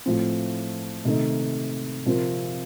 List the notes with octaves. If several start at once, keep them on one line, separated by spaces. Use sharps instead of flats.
A2 F3 C4
C3 D#3 A3 D#4
C3 F3 C4 F4 A#4